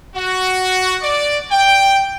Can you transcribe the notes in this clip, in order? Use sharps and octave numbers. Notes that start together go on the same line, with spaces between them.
F#4
D5
G5